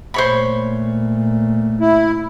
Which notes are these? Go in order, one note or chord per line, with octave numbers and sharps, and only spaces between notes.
A#2 A3 C5 C#5 B5
E4